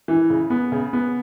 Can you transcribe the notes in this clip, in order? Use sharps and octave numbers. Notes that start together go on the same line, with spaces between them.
E3
C#3
B3
C#3
B3